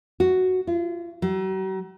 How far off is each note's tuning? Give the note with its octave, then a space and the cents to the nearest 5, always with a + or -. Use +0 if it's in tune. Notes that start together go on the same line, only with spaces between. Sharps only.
F#4 +0
F4 -35
F#3 +45